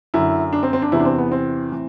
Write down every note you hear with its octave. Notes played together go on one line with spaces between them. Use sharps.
F#2 D3 E4
D4
C4
C4
D4
E2 C3 E3 E4
D4
C4
B3
C4
A2 E3